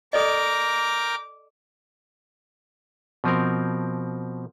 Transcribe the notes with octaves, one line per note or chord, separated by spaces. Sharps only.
A4 A#4 D5 D#5 G5 A#5 D6
B2 F3 C4 A#4